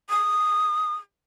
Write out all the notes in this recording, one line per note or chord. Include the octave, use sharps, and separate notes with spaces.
D#6